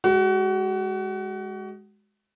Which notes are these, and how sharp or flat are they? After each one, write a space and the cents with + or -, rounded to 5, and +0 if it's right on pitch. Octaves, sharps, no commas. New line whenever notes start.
G#3 +0 F#4 +30